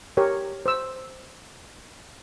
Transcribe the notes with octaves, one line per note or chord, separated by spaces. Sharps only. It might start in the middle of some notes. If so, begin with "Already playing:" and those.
G4 A#4 C#5
C5 E6